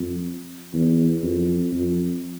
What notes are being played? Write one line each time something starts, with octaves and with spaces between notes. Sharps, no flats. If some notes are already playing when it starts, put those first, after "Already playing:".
Already playing: F2
E2
F2
F2